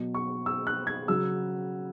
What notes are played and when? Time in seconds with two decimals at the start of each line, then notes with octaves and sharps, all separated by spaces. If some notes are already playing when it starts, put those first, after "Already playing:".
Already playing: B2 F#3
0.14 C#6
0.46 E6
0.67 F#6
0.87 G#6
1.08 C#3 F#3 E6